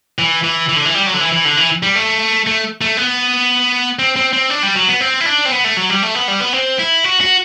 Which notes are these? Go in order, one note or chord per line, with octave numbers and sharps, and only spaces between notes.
E3
E3
E3
D3
E3
G3
F#3
D3
E3
E3
D3
E3
G3
A3
A3
A3
B3
C4
C4
C4
D4
G3
F#3
B3
C4
E4
D4
C4
B3
A3
F#3
G3
A3
B3
G3
B3
C4
E4
F#4
F#4